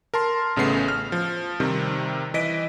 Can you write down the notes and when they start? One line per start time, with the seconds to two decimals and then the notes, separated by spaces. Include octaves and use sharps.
0.14 A#4 A5 C6
0.56 A1 C#3 A3 B3 C7
0.88 F6
1.12 F3
1.60 C3 D#3 G3 C4
2.34 E3 D#5 B6 D7